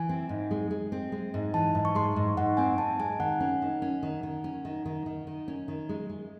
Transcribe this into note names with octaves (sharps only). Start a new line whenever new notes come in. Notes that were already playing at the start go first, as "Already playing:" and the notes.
Already playing: E3 G#5
C4
G#2
G#3
G#3
C4
G#3
G#2
E3 A5
G#2
C#6
G#3 C6
G#2
G#2 F#5
C4 G#5
C4 A5
G#3 G#5
D#3 F#5
C#4
D#3
C#4
D#3
D#3
C#4
D#3
D#3
D#3
D#3
C#4
D#3
G#3
G#3